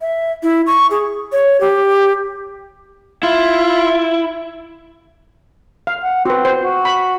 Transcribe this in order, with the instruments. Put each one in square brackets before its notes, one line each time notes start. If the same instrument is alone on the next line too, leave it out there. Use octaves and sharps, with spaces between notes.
[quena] E5
E4
C#6
G#4
C#5
G4
[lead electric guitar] E4 [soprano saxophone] F4
[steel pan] F5
[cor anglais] F#5
[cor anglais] C4 [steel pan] F#4 B4
[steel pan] C5
[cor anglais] F#4
[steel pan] B5